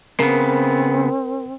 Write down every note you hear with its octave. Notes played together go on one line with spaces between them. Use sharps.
C#3 B3 C4 A#4